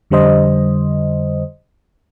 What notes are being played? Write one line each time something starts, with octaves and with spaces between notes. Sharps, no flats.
F2 D3 G3 C5 D#5